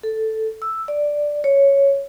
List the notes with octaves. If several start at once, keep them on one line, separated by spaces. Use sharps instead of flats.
A4
E6
D5
C#5